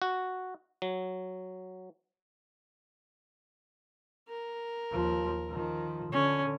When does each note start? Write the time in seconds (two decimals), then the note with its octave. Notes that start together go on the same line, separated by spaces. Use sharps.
0.02 F#4
0.82 F#3
4.29 A#4
4.92 D#2 F3
5.49 D#3 F3
6.12 D3 C#4